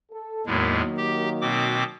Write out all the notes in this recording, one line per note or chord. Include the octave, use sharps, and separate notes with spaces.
A4
E2 A2 D#3 F#3 G#3 A#3
G4
B2 C4 D6